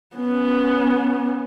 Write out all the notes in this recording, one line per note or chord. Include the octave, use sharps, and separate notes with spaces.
B3 C#4